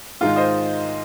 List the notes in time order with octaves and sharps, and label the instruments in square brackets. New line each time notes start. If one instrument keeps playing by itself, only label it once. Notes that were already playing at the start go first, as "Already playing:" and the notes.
[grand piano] G#2 D#3 G#3 D#4 [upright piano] F4
[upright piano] C5 D#5